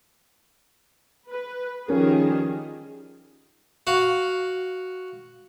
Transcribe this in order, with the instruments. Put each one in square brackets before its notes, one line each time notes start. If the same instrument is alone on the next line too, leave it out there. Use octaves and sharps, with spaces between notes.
[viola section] B4
[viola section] D#3 G3 G#4 [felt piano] F3 C#4 A#4
[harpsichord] F#4 F5